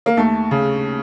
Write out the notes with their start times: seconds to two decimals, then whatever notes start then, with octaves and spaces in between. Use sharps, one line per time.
0.06 A#3
0.17 D#2 A3
0.51 C#3